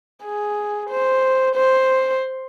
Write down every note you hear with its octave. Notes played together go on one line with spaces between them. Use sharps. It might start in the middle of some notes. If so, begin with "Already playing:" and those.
G#4
C5
C5